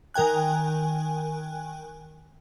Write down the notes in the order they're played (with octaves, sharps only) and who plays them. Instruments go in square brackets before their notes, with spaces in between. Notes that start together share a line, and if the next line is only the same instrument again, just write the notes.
[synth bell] D#3 A#4 G5 G#5 F#6